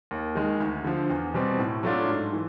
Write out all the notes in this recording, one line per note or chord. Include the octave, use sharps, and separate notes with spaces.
D#2
D#3 G#3
D2
D3 F3
E2
B2 G3 C4
A2
F#3 A3 D4 F4
G#2
E3